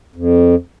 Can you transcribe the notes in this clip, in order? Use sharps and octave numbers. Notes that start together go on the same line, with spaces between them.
F2